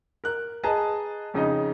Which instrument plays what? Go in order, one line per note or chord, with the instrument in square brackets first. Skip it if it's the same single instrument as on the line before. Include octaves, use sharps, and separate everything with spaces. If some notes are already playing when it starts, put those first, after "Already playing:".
[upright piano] A#4 F#6
G#4 B4 D#5 A5 A#5
F2 C#3 D#4 D#5